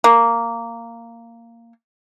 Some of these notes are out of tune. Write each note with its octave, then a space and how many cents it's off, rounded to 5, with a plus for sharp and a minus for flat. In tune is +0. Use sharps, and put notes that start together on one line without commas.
A#3 -10